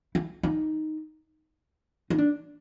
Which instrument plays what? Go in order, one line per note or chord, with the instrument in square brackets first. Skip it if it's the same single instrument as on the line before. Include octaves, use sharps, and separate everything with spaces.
[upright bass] E4
D#4
D#4
D4